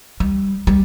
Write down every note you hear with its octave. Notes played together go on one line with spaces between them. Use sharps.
G3
G3